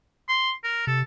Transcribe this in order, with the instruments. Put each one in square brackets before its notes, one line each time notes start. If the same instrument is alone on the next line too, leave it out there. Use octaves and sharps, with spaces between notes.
[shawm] C6
A#4
[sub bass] C3 [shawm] A4